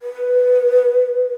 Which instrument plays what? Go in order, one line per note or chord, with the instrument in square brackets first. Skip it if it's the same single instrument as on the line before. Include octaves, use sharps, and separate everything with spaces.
[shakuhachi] B4